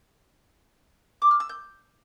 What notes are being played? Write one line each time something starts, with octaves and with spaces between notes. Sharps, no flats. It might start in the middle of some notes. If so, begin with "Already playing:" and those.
D6
F6
E6
G6